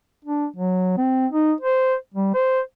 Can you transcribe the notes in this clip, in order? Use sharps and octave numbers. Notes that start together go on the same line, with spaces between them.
D4
F#3
C4
D#4
C5
G3
C5